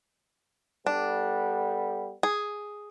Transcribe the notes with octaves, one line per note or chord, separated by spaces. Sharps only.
G3 B3 D4 A4
G#4